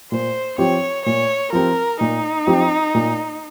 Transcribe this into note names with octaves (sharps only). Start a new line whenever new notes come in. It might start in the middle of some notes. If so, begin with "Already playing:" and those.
A#2 C5
F3 C4 G4 C#5
A#2 C#5
F3 C4 G4 A#4
A#2 D#4
F3 C4 G4
A#2